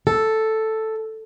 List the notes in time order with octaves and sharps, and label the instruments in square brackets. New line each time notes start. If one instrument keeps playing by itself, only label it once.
[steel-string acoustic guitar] A4